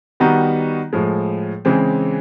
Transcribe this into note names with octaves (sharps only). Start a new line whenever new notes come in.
D#3 G3 B3 D#4 F#4
A2 F3 G#3
C#3 E3 G#3 C4